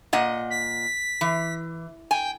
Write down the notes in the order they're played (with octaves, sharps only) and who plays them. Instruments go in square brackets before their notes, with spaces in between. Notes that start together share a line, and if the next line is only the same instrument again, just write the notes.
[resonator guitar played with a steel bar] A#2 D#5 F#5
[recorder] B6
[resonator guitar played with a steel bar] E3
[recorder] G5 [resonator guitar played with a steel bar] G#5